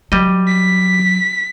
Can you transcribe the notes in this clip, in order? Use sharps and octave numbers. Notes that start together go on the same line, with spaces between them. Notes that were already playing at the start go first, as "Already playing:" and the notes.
F#3 G3 D#5
B6